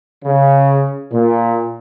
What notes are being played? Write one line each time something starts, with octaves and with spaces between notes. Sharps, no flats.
C#3
A#2